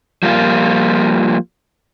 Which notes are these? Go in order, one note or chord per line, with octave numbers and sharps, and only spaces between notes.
F3 G3 A#3 F4